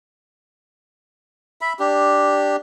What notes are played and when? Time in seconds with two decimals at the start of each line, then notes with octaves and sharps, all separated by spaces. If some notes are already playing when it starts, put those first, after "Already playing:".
1.61 E5 B5
1.79 D4 G4